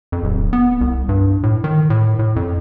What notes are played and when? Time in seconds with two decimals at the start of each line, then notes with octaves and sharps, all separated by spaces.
0.12 F2
0.24 D1
0.53 B3
0.81 C2
1.09 G2
1.43 A2
1.64 D#3
1.90 A2
2.19 A2
2.36 F2